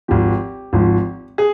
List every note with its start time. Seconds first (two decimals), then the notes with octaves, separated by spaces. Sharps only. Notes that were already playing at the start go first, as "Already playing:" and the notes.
0.08 G#1 G#2 F3 G4
0.73 G#1 G#2 F3
1.38 G#4